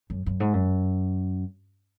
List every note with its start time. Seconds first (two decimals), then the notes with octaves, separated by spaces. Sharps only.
0.10 F#2
0.26 F#2
0.40 G#2
0.53 F#2